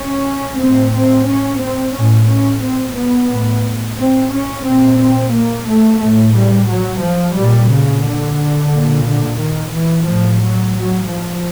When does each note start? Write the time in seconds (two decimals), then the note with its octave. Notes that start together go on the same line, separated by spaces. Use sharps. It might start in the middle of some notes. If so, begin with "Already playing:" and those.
Already playing: C#4
0.61 A2 C4
0.94 C4
1.29 C#4
1.63 C4
1.96 A2 C#4
2.30 C#4
2.64 C4
2.97 B3
3.31 A2
3.99 C4
4.33 C#4
4.67 A#2 C4
5.00 C4
5.34 A#3
5.68 A3
6.02 A2 A3
6.36 G3
6.70 F#3
7.03 F3
7.37 A#2 G3
7.71 C#3
8.05 D3
8.73 A#2
9.06 D3
9.40 D#3
9.74 E3
10.07 A2 F3
10.42 F#3
10.76 F#3
11.09 F3